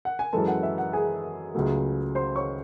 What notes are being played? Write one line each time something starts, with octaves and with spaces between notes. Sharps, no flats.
F#5
G#5
F#2 E3 G#3 A4 A5
F#5
E5
F#5
G#4 G#5
C#2 C#3 F#3 A3
C5 C6
C#5 C#6